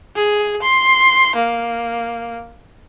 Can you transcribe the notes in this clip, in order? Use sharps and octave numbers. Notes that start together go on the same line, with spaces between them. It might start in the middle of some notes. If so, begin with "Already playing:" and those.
G#4
C6
A#3